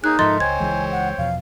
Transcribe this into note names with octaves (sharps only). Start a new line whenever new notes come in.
A#3 D#4 G#4 C#5 F#6
G#2 F3 A4 A#4 D#5 E5 C6 A6
C#2 C5 C#5 G5 G#5 G#6
C#2 E3 G#3
F#5
E2 B2 F3 F5